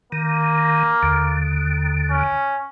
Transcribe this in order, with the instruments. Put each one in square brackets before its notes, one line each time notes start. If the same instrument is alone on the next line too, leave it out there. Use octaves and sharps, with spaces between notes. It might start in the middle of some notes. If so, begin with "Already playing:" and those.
[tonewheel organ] D#3 [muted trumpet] A#3
[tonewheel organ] D#2 D3
[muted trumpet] C#4